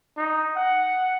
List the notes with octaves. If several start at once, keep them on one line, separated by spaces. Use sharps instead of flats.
D#4
F#5